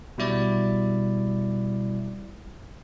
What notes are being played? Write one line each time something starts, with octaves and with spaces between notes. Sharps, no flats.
B2 G3 E4 D5